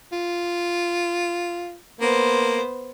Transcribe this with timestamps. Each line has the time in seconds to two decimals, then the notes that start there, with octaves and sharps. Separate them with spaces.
0.12 F4
2.00 A#3 B3 C5